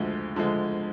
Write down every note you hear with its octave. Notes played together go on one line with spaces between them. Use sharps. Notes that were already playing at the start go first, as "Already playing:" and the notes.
Already playing: D2 D3 F3 G#3
D3 F3 G#3